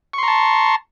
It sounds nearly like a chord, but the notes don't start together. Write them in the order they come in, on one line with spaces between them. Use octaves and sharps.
C#6 C6 A#5 A5